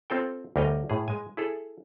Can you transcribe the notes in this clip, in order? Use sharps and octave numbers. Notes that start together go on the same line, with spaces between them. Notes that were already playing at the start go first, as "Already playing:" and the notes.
C4 F4 A4 G5
D2 G3 A#4 C#5 D#5
A2 G#4
G#3 G#5
E4 G#4 A4